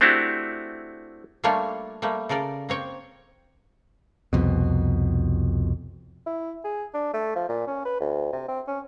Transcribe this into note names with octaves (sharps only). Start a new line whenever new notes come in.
A3 C4 D4 E4 F#4 G4
G3 A3 A#3 D4 F4 C#5
G3 A3 A#3
C#3 A4 A#4 D5
A#3 C4 C#5 G5
C2 F2 B2
E4
G#4
D4
A3
F3
A#2
C#4
B4
D2
C3
C4
C#4